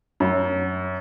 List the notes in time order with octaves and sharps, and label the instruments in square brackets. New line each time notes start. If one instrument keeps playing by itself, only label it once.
[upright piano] F#2